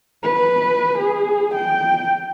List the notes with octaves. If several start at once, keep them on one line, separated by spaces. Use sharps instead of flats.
B4
G#4
G5